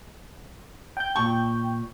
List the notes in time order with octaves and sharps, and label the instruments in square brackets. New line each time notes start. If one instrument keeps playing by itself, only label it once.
[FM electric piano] G5 G6
[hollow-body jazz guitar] A#2 A5 [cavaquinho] C#6